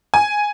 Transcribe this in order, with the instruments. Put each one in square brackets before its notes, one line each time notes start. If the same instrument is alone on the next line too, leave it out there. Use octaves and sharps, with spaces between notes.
[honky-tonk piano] G#5